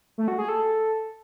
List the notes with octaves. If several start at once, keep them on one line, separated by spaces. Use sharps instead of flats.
A3
F#4
G#4
A4